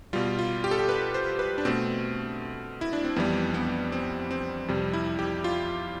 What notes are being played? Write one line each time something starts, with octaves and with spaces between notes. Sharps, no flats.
B2 G3 F4
F4
G4
A4
G4
B4
C5
B4
D4
B2 A3 C4
E4
D4
C4
F2 E3 G3 B3
B3
C4
C4
F2 C3 G3
E4
G4
F4